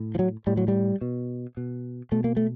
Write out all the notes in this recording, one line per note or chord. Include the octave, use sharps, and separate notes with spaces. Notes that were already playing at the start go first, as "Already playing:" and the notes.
Already playing: A2
F3
F#3
A2 G3
F#3
G3
B2
B2
B2 A3
A#3
A3